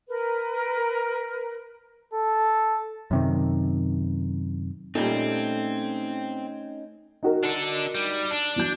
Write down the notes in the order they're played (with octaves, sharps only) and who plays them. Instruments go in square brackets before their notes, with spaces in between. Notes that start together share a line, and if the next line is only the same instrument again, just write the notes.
[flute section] A#4 B4
[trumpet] A4
[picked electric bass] F#2 C3 D#3
[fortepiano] A#2 G3 [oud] A3 [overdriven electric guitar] C4 [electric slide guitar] C#4 D#4
[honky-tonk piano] D#4 F#4 A#4
[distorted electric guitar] D4 A4
G3
D4
[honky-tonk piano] E2 F#3 G6